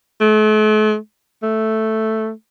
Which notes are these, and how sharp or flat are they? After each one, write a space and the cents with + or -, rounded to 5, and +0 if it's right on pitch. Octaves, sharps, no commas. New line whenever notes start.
A3 -45
A3 +0